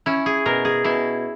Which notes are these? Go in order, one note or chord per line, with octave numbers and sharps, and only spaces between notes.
C#4 E4
G#4
B2 A#4
G#4
B2 E4